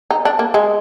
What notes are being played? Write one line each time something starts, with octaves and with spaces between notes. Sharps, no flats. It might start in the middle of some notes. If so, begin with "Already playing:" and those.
D#4
D4
A#3
G#3